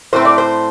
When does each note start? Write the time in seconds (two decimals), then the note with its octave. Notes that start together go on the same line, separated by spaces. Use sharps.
0.13 A2 A3 C4 C5
0.25 D5
0.38 C5